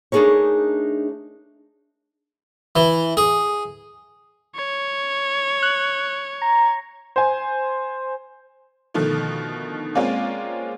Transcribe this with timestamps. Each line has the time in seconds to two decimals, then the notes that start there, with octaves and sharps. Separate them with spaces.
0.12 A3 D4 D#4 G#4 A#4 C#5
2.76 E3
3.17 G#4
4.55 C#5
5.63 F#6
6.42 A#5
7.16 C5 G#5
8.94 B2 D3 D#3 F3 A3
9.95 G#3 A#3 C4 C#4 F4 D5